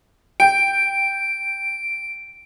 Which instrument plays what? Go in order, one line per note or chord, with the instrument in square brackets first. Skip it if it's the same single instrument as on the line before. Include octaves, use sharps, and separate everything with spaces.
[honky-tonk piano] G5 [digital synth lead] D7